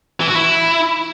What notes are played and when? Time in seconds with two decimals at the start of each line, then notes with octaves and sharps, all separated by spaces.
0.20 E3
0.28 F#4
0.35 E4